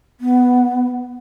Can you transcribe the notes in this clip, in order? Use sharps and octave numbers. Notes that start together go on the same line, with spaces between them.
B3